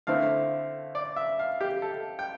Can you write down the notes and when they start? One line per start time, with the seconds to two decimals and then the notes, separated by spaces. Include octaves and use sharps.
0.07 D3 A3 C4 E4 F5
0.95 D5
1.16 E5
1.39 F5
1.61 G4
1.82 A4
2.19 G5